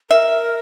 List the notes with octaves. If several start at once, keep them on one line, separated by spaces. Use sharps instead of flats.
A#4 E5